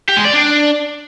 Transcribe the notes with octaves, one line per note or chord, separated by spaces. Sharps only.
G4
G#3
D5
D4